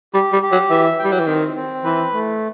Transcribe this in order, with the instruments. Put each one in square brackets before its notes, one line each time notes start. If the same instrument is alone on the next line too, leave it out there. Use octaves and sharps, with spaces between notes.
[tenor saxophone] G3 [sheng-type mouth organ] G4
[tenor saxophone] G3
[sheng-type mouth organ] G4
[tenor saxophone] F#3
[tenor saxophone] E3 [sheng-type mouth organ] E5
[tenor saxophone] G3 [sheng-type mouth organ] G5
[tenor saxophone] F#3
E3
[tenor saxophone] D#3 [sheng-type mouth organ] C4
[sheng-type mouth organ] C4
[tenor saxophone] E3 [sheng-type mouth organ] B4
[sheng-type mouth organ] A3